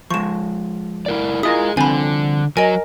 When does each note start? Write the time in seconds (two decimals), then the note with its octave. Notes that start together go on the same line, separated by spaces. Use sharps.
0.10 F3 G#3 C#6 E7
1.06 E4 A#4 D5
1.43 E4 F4 G#4 A#4 D#5 D#6
1.77 C2 D3 F3 C4 G#5 B5
2.57 F#3 A#4 D#5 G#5